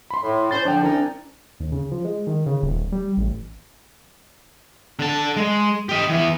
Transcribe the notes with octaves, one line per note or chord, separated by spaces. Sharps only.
B5 C6
A2
C#4 C5 C#5 A6
D3 F3 D4 G5
C2 C#4 D#4
D#2
C#3
F3
G#3
D#3
C#3
D#1
G3
A1
D3 A5
G#3
G4 D#5
E3 B3